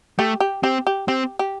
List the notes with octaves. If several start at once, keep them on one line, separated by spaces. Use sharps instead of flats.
A3 G4
G4
C4 G4
G4
C4 G4
G4